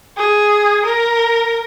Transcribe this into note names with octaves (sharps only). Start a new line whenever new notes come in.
G#4
A#4